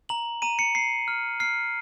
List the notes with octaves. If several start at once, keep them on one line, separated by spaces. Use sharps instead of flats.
A#5 F#7
A#5 D#7
C#7
A#5 C7
F6
F6 C7